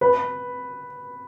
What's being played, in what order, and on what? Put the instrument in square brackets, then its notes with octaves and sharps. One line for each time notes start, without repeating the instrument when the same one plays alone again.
[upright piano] B4